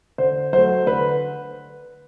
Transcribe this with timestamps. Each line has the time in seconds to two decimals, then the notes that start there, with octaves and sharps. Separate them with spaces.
0.18 D3 C5
0.53 F#3 A3 C5
0.87 D3 B4